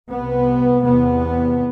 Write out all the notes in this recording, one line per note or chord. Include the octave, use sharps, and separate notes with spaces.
C2 C3 B3
E2 C3 B3